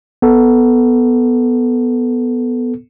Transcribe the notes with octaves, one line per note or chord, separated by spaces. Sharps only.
B3 A4